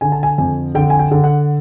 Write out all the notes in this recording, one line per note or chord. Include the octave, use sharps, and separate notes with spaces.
D3 G#5
A5
G#5
F2 G#5
D3 G5
G#5
G5
D3
F#5